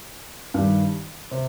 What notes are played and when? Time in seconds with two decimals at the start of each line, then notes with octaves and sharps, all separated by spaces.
0.54 G2 D#3 G3
1.31 C3